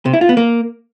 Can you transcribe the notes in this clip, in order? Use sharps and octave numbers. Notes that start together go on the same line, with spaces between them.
C3
E4
F4
B3
A#3